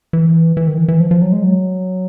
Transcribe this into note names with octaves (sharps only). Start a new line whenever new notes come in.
E3
E3
D#3
E3
E3
F3
F3
F#3
G#3
F#3